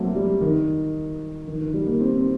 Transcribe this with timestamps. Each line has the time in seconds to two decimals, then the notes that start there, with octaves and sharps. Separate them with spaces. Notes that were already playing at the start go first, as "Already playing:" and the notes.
Already playing: F#3 A3 A#3 C4
0.15 G3
0.41 D#3
1.47 D#3
1.60 D#3
1.74 G3
1.87 A#3
2.01 C4
2.16 C4